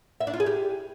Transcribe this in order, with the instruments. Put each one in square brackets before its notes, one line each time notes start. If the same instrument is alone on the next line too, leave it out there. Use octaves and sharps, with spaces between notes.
[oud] E5
D4
F4
G#4
G4